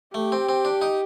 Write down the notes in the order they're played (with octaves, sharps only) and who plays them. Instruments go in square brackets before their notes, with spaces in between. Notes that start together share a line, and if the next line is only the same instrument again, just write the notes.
[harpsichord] A3 [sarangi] G4
[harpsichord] C4
C4
D4
D#4